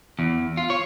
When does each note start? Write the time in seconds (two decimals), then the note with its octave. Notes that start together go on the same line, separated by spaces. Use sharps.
0.19 E2
0.57 F4
0.70 C#5